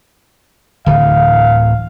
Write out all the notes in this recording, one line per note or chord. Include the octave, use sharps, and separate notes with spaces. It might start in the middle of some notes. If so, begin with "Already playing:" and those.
D1 D3 E3 F5